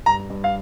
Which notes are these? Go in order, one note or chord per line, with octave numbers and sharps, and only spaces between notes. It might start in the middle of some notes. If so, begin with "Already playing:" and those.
G2 A#5
G2
F5